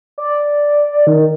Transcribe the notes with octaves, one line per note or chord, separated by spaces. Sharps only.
D5
D#3